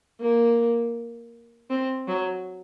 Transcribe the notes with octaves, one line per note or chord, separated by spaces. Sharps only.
A#3
C4
F#3